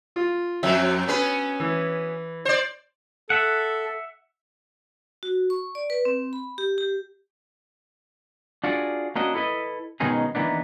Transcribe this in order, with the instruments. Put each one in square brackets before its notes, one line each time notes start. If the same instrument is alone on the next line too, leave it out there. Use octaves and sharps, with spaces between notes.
[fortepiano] F4
[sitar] F2 F#3 [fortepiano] E5
[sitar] B3 C#4 B4
[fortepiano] E3
[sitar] C5 D5
[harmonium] A4 [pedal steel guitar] E5 F#5
[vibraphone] F#4
C#6
D5
B4
C4
B5
G4
G4
[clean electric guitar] D4 F4 F#4 G#4 D5
A#3 C#4 D4 F#4 D#5
E4 A4 B4 D#5
B2 D#3 G#3 C#4 D#4 G#4
D#3 E3 G#3 A#3 B3 D4